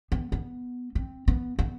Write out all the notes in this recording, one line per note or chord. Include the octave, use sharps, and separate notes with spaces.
B3
B3
C4
B3
B3